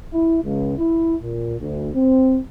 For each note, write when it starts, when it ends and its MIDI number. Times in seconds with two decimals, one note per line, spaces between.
0.13 0.37 64
0.44 0.74 37
0.78 1.14 64
1.22 1.54 46
1.59 1.89 38
1.94 2.38 60